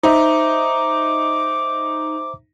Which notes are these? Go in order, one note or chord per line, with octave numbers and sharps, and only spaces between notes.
D#4 C5 E5 A#5 D6